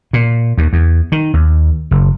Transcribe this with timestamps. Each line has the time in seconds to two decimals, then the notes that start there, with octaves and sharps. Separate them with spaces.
0.13 A#2
0.58 D#2
0.73 E2
1.12 D#3
1.34 D#2
1.91 F#1